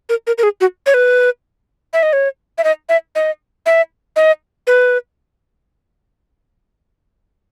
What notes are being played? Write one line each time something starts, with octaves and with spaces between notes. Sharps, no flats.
A#4
A#4
A#4
G#4
F#4
C#5
B4
E5
D#5
C#5
E5
D#5
E5
D#5
E5
D#5
B4